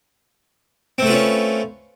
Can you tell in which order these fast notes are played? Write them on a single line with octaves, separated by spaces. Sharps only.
C4 A3 B4 F4 C#4